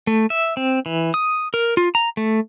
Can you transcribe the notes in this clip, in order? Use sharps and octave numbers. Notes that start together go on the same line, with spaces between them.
A3
E5
C4
E3
D#6
A#4
F4
A#5
A3